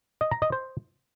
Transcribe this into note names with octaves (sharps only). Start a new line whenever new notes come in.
D#5
A#5
D#5
C5